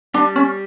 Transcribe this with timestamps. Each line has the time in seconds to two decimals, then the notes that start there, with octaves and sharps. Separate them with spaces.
0.14 G3 D4
0.36 C#4